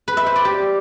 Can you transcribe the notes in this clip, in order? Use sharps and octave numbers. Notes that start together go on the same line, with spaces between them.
B4
E5
C5
D5
G4